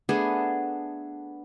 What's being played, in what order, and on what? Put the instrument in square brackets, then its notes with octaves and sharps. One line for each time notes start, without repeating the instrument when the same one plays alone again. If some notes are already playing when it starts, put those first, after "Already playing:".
[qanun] A3 B3 D4 G#4